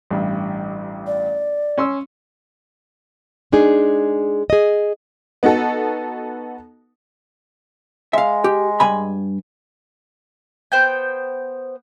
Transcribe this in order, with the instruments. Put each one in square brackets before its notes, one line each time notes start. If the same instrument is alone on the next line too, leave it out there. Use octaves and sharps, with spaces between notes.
[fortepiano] A1 G2
[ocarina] D5
[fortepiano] C#4 C6 E6
[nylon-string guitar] G#3 D4 D#4 G#4
G#4 D#5
[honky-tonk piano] B3 D#4 F#4 A4
[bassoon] G#3 [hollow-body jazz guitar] E5 F5
[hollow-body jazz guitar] G4
G2 G#5 B5
[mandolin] B3 C5 G5 G6